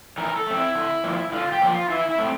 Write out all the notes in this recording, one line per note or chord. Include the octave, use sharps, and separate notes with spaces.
E3 A#4
A4
A3 C4
E4
D3
F3 A#3
D3 F4
G4
F3 A#3
F4
E3 E4
E4
A3 C4